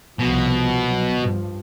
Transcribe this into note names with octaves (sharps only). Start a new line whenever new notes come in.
C2 B2 F3
F#3
G2 F3